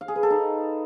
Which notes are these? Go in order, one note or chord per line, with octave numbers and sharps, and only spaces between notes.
F5
G#4
B4
A4
D#4